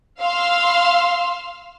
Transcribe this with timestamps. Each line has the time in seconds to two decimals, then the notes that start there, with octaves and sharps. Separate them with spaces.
0.20 F5 C6 E6 F6